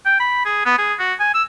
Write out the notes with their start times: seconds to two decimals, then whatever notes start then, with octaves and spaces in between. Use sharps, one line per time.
0.06 G5
0.20 B5
0.45 G#4
0.65 B3
0.78 G#4
1.00 F#4
1.20 G#5
1.34 E6